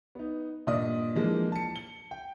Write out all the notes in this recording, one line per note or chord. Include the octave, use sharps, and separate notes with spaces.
B3 D#4
G2 A#2 D5 D#5 D#6
E3 F3 G#3 A#3 D4
A5 C#7
G7
G5